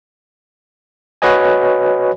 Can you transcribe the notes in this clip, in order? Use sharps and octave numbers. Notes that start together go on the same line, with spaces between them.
F#4 B4 C#5 D#5 G#5